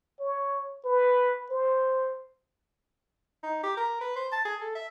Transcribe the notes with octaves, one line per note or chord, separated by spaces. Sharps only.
C#5
B4
C5
D#4
G4
A#4
B4
C5
A5
G#4
A4
E5